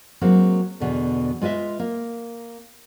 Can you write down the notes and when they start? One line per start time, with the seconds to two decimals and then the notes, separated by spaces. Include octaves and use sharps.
0.21 F#3 G#3 A#3 C4
0.80 E2 B2 D3
1.41 G#3 F4 B4 D#5 E5
1.80 A#3